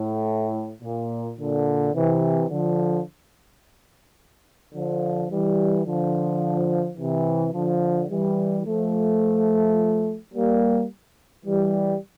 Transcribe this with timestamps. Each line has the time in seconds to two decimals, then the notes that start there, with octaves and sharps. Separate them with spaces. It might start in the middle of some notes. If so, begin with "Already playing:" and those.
Already playing: A2
0.82 A#2
1.38 A#2 D3
1.94 C3 E3
2.50 D3 F3
4.73 D3 F3
5.30 E3 G3
5.85 D3 F3
6.97 C3 E3
7.54 D3 F3
8.09 E3 G3
8.66 F3 A3
10.34 G3 A#3
11.45 E3 G3